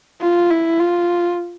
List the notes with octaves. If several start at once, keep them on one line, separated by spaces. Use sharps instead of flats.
F4
E4
F4